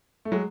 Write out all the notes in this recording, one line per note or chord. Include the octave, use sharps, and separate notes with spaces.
A3
F#3 G#3